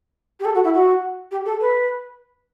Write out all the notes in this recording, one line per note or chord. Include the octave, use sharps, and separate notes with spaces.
G4
A4
F#4
E4
F#4
G4
A4
B4